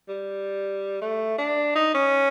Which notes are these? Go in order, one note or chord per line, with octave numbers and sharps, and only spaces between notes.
G3
A3
D4
D#4
C#4